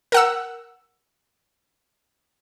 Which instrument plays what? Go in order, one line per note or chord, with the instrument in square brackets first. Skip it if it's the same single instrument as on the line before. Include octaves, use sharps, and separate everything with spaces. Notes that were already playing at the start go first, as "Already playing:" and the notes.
[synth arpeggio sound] A#4 F#5 E6